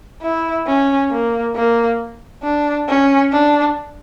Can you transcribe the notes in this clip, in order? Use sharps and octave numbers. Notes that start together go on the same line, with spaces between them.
E4
C#4
A#3
A#3
D4
C#4
D4